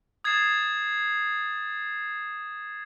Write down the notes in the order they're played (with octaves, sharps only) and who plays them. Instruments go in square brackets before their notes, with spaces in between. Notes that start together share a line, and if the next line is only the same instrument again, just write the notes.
[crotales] D#6 G#6 A6 C7 E7